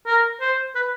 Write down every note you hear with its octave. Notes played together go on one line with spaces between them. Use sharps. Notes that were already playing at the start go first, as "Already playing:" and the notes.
A#4
C5
B4